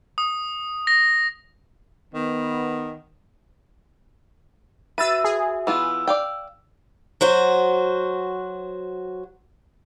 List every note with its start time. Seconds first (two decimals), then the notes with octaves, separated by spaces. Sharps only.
0.18 D#6
0.87 A#6
2.14 D#3 B3
4.98 F#4 B4 E5 E6 A6 D#7
5.24 G#4
5.67 E3 B3 F4 E6
6.08 D5 F5 G5
7.21 F#3 F#4 C5